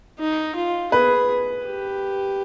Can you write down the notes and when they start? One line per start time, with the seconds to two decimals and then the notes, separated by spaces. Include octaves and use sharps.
0.19 D#4
0.55 F4
0.92 G#4 B4
1.66 G4